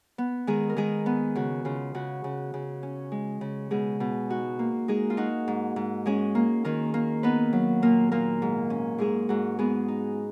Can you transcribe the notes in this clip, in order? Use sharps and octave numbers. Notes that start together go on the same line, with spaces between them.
B3
D#3 G#3 G#4
A#4
D#3 G#3 G#4
B3
C#3 F#4
C#3 F4
C#3 F#4
C#3
C#3
C#4
G#3
C#3
B2 G#3 G#4
B2
D#4 F#4
A#3
G#3 D#4 G#4
F4
D#4 F#4
G#2
G#2
G#3 C#4 G#4
A#3
D#3 A#3 A#4
A#3
B3 D#4 B4
F#3
A#2 A#3 A#4
A#2 A#3 A#4
G#2
C#4
G#2 G#3 G#4
G#2 F#4
G#3 B3 G#4
D#4